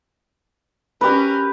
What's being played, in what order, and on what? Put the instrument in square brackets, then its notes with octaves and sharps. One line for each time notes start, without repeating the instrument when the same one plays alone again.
[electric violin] C#4 A#4 [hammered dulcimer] G4 B4